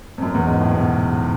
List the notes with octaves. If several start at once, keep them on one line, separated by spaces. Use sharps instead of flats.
F2
F#2
E2
G#2
A2
B2